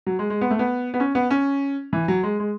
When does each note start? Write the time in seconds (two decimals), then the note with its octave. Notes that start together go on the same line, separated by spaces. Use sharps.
0.07 F#3
0.19 G#3
0.30 G#3
0.41 B3
0.51 A3
0.59 B3
0.94 B3
1.00 C#4
1.15 B3
1.30 C#4
1.93 E3
2.08 F#3
2.23 G#3
2.40 G#3